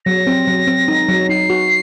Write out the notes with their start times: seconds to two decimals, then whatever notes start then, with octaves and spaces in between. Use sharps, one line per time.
0.05 F#3 A#6
0.27 C4
0.47 F#3
0.67 C4
0.88 D#4
1.08 F#3
1.29 D#4 C7
1.50 F#4